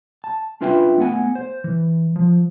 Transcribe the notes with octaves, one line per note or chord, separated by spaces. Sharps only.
A5
C#4 D4 F4 B4 E5 G5
A3 B3 F#5 G#5
C5
E3
F3